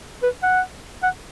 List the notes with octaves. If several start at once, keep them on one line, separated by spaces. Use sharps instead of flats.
B4
F#5
F#5